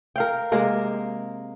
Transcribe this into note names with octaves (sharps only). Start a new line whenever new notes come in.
A#4 F5 G5
C3 G#3 A#3 A#4